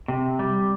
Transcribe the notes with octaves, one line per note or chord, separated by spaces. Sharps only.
C3
G3